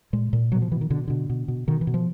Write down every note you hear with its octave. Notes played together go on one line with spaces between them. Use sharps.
A#2 G#3
A#2
B2 F#3
F3
B2 E3
D#3
B2 D3
B2 D3
B2
B2
B2 D#3
E3
B2
F3